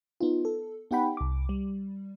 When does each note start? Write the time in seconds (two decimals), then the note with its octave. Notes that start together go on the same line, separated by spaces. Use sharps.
0.20 B3 D#4 F4
0.45 A4
0.91 B3 D#4 G4 F#5 G5 B5
1.17 C2 D6
1.49 G3